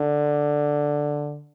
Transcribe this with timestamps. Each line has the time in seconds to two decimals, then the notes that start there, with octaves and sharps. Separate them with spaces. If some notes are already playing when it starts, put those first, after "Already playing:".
Already playing: D3